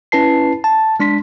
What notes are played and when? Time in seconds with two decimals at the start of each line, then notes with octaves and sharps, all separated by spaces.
0.12 C#4 E4 B4 A5 C7
0.64 A5
1.00 G#3 D4 C6 B6